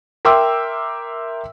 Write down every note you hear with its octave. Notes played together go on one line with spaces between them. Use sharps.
A#4 E5 G5 C6 D6 E6